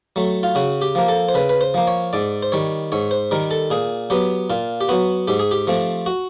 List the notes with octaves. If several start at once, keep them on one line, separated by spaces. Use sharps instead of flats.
F#3 A3
F4
C#3 F#4
G4
F3 A#3
A4
C5
C#3 B4
B4
C5
F3 A#3
C#5
G#2 D5
C5
D#3 G3 C#5
G#2 C#5
C5
D#3 G3 A#4
A4
A#2 G#4
F#3 B3 G4
A#2 F4
G4
F#3 B3 F#4
G#2 G4
G#4
G4
F3 A3 C4
F#4